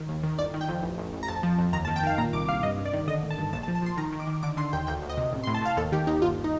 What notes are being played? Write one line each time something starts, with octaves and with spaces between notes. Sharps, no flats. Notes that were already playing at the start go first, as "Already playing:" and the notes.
Already playing: D#3
D#2
D#3
G1 D5
D#3
G5
F2
A1
A1
A1
A#5
F2 A5
F3
F2
D#2 A#5
A5
D#3
G5
D#3 F5
A#2 A#5
C2 D6
C2 F5
G2 D#5
G2
D5
D#3
D3 D#5
A1
A5
G2
A#1 A5
A5
F3
A5
F3 C6
D#3 A#5
D#3
D6
D#3
D3 D6
D3 C6
D#2 G5
D2 G5
D2
D#5
C3
A1
C6
A2
A5
A2 F5
D#2 A4
D#3 G4
D#2 D#4
G1 F4
D#4